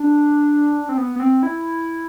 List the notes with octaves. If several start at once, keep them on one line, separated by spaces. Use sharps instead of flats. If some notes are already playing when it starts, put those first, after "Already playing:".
Already playing: D4
C4
B3
B3
C4
E4